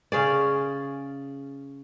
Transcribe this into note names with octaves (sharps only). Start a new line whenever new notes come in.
C#3 C#4 G#4 D5